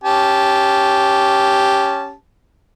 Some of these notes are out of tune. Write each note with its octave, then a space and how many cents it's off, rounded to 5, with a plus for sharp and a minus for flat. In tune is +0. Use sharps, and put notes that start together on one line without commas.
C#4 +0 G4 +0 A5 -15